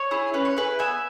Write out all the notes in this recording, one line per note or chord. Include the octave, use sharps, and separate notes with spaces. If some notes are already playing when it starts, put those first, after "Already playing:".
Already playing: C#5
E4 G#4
C#4 B4
C#5
E4 G#4 B4
B3 E5 G#5